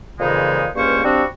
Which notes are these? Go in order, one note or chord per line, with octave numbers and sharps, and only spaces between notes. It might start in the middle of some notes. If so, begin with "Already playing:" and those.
F2 A#2 C#3 E3 G#3 D#4
C#2 G2 A#3 C#4 C5 C#6
F3 G3 C4 D4 F#4